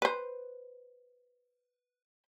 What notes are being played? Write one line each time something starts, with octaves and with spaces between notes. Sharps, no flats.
B4 C5